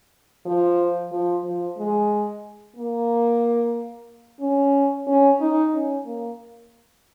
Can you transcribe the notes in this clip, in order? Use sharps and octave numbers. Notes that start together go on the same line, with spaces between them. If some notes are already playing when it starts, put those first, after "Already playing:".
F3
F3
F3
G#3
A#3
C#4
C#4
D#4
C#4
A#3